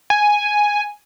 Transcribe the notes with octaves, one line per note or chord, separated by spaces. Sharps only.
G#5